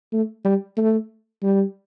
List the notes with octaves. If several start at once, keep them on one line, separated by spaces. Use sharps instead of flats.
A3
G3
A3
G3